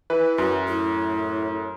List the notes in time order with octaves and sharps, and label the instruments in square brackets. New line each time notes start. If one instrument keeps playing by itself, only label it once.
[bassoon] E3 [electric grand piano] B4
[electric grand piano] F#2 [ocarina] F#4
[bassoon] A2 [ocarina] E4